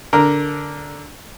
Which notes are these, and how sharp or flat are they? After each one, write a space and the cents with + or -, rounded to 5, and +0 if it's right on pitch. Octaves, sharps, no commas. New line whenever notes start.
D3 -10 A#4 +0